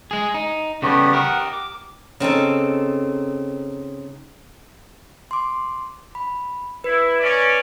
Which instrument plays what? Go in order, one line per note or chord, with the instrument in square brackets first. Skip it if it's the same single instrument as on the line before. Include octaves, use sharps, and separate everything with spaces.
[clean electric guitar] G#3 G#4
D#4
[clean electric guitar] C#3 G3 [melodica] A3 B3 G4
[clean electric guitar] G4 A#4 [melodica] F#5 D#6
[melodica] D6
[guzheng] C#3 C4 D#4 A4
[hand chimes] C6 D6
B5
[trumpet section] E4 [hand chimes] B4
[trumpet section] C#4 D5